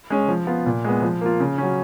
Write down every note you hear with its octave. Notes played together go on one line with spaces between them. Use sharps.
G#3 C#4
F3
B3 F4
A#2
G#3 B3
F3
A#3 F4
C#3
F#3 C#4